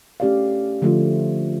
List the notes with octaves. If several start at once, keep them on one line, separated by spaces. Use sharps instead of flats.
A3 C#4 G4 D5 F5
D3 F3 A3 C#4 F4